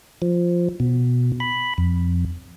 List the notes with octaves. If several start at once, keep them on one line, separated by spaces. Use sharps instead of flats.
F3
B2
B5
F2